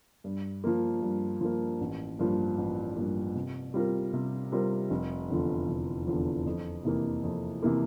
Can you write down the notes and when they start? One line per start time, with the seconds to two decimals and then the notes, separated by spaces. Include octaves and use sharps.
0.24 G2
0.64 F3 A#3
1.02 G2
1.41 F3 A#3
1.81 A1
2.19 G2 F3 A#3
2.58 A1
2.97 G2 F3 A#3
3.35 C3
3.74 G3 C4 F4 A#4
4.13 C3
4.52 G3 C4 F4 A#4
4.90 F1
5.30 E2 D3 F3
5.69 F1
6.07 E2 D3 F3
6.46 F2
6.85 C3 E3 A#3
7.24 F2
7.63 C3 E3 A#3